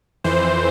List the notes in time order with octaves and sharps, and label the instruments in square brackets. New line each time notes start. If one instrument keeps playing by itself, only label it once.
[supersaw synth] F2 E3 C5